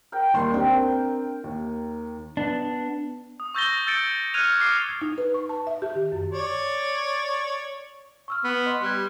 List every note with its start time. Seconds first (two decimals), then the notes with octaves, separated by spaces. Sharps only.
0.12 A#4 G5
0.34 D#2 G3 C6
0.52 C4 D4 A#4 G5
1.44 D#2
2.37 B3 D4
3.40 D#6
3.54 C#6 E6 G6 A6 A#6 G7
3.87 E6 G6 A6 C#7 D7
4.34 F6 F#6 G#6 C#7 D#7 F7
4.60 D6 F6 C7
4.89 G#6
5.02 D#4
5.18 B4
5.34 C#6
5.49 A5
5.67 E5
5.82 G4
5.95 D#3
6.12 F#2
6.32 C#5 D5
8.28 C#6 E6 F6
8.44 B3
8.66 D#5 C6
8.82 G3 F#6 G#6